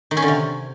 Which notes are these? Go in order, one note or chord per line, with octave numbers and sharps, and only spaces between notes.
D#3
C#4
D3
C3